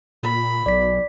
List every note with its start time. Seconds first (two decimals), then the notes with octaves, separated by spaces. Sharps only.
0.23 A#2 B5
0.66 B1 D5 B6